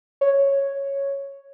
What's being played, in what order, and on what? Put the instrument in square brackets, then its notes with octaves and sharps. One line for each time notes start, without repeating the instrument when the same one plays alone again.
[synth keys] C#5